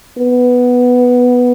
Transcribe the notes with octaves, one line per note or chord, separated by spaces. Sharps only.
B3